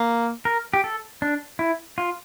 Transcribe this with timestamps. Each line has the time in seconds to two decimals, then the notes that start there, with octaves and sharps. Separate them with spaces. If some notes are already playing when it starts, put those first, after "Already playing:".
Already playing: A#3
0.45 A#4
0.74 G4
0.84 A4
1.22 D4
1.59 E4
1.98 F4